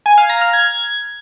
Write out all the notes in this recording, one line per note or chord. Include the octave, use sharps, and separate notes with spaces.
G#5
F5
A#5
F6
G#6